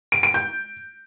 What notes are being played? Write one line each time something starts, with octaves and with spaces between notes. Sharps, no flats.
D7
D7
G6